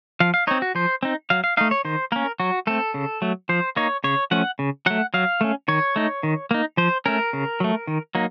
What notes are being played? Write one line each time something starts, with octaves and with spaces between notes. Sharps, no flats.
F3 F5
F5
C4 D#4 C#5
F#4
F3 C5
C4 D#4
F#3 F5
F5
A3 D#4 F5
C#5
D#3 C5
A#3 C#4 A#4
F#3 F#4
A3 C4 A4
C#3
F#3 A3
F3 C5
A#3 D#4 C#5
C#3 C#5
F3 A3 C#4 F#5
C#3
F#3 A3 F#5
F#3 F5
A3 C#4
D#3 C#5
A3 D#4
D#3
A#3 D#4
F3 C5
A3 C#4 A#4
C#3
F#3 A3
D#3
F#3 A#3 D#4